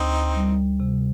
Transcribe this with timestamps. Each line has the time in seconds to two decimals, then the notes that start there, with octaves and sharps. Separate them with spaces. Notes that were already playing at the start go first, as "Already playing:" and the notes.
Already playing: D2 C4 D#4
0.36 G3
0.80 C3